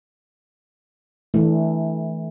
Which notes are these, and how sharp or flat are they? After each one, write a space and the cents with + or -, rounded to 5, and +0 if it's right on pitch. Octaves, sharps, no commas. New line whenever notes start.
E3 -25 A3 -15 D4 +0